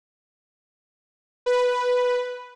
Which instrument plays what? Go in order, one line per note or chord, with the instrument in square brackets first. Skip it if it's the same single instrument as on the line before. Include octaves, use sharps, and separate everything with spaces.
[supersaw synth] B4